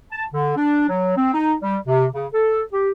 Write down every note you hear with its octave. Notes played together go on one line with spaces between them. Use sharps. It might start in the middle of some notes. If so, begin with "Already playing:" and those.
A5
D3
D4
F#3
C4
D#4
G3
C3
C#3
A4
G4